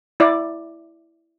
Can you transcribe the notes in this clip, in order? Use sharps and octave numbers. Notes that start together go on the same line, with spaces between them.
E4 D5